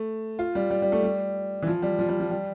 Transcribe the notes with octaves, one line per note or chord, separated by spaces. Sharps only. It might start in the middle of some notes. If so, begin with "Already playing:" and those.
Already playing: A3
F4
G3
G3
G3
A3
G3
E3
F3
G3
F3
G3
F3
G3